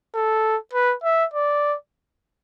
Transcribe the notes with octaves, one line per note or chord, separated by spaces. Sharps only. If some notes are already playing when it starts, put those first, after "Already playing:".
A4
B4
E5
D5